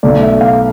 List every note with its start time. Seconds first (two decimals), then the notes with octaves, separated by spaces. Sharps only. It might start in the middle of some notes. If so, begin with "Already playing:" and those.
0.03 B1 B2 A3 D5
0.22 E5
0.41 F5